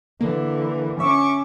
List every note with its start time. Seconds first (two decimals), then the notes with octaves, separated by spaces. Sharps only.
0.21 D3 E3 A#3
1.00 C#4 E5 C#6 D6